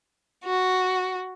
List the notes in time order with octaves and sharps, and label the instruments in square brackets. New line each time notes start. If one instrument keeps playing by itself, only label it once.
[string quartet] F#4